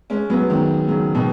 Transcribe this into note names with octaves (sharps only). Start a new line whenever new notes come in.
G#3 C#4
F#3 B3
D#3 G#3
C#3 F#3
B2 D#3